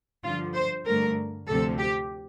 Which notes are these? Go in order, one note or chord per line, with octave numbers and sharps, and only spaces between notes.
G2 D3 F3 F4
C5
G2 D3 A3 A#4
D2 C3 F3 C4 A4
G4